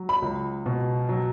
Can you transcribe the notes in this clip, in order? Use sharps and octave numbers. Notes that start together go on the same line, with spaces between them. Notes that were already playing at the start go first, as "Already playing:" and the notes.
Already playing: F#3
B5
C#2
B2
F#3